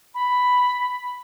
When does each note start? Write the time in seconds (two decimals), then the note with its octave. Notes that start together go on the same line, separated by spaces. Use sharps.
0.14 B5